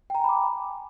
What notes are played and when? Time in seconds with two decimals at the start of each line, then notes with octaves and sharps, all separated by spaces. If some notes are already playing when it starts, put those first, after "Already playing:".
0.10 G5
0.15 A#5
0.19 G#5
0.24 B5
0.29 D6